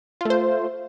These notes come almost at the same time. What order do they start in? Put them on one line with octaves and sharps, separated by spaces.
F4 A3 C5